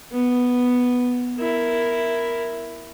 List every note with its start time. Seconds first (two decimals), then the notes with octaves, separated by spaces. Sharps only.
0.12 B3
1.37 E4 A#4